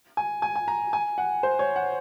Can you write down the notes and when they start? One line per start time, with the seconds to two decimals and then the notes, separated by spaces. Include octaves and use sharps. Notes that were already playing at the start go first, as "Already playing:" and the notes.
0.17 G#5
0.42 G#5
0.56 G#5
0.68 A#5
0.93 G#5
1.18 F#5
1.43 C5
1.59 C#5
1.76 F#5